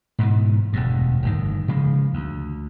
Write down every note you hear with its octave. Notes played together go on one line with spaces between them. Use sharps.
G#2 B2 E3
E1 D2 G2
G1 A2 D#3
C#3 F3 G#3
D2